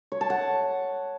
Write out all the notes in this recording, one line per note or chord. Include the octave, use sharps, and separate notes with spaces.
C#5
A5
F#5